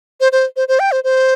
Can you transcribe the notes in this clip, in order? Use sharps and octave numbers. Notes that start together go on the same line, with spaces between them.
C5
C5
C5
C5
G5
C5
C5